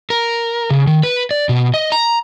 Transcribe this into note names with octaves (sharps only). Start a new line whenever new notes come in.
A#4
C#3
D#3
B4
D5
B2
D#5
A#5